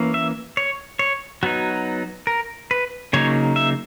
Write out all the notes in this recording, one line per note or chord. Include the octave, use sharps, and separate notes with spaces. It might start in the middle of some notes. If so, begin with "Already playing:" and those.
Already playing: E3 A#3 C#4
E5
C#5
C#5
F#3 B3 D#4 F#4
A#4
B4
C#3 F#3 A#3 D#4 C#5
E5